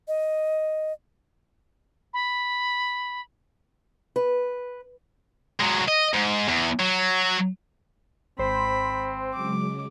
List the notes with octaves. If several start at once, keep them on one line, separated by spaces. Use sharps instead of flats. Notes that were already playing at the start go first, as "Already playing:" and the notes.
D#5
B5
B4
F#3 G#3
D#5
G#2
E2
F#3
G#1 C4 C5 B5
C#3 F#3 G#3 D6